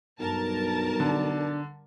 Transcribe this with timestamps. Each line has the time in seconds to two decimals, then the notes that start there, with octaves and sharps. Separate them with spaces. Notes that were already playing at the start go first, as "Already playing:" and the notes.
0.20 B1 G2 A#4 A5
1.00 D3 D4